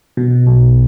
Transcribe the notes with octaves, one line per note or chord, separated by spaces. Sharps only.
B2
B1